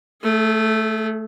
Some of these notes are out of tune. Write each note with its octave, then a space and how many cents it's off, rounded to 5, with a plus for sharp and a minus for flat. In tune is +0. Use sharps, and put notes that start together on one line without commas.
A3 +0 G#4 +45